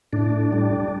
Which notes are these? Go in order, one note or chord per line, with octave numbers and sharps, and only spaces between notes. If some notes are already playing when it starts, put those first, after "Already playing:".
A2 D4
G3